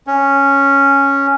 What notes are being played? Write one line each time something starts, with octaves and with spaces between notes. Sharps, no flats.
C#4